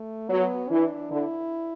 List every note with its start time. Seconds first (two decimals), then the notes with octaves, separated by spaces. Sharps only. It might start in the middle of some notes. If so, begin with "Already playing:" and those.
Already playing: A3
0.29 F#3 B3
0.71 E3 D4
1.11 D3 E4